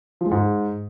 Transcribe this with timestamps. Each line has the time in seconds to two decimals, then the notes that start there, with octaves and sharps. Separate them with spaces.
0.21 F3
0.26 G#3
0.31 G#2